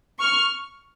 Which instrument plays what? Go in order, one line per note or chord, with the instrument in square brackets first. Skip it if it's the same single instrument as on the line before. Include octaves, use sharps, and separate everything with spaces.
[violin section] C#6 F6